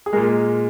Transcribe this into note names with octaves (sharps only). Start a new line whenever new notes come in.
G#4
A#2 G#3 A#4